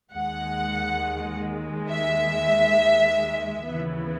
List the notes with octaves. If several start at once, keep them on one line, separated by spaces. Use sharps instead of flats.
D#2 D#3 G#3 F#5
E5
D#2 C#3 E3 B3 E4